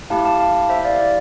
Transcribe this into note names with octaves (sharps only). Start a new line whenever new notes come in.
A3 E4 G4 F5 A5
F5 A5
F5 A5
C5 E5
D5 F5
D5